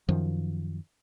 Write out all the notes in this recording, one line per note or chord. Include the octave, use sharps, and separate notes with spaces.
F#2 D#3 F3